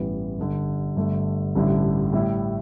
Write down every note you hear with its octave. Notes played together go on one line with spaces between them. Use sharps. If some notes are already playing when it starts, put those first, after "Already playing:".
Already playing: A1 G2 E3 G3 B3
G1 G2 D3
G1 G2 D3 A3
A1 G2 D3 G3 E4
A2 G3 E4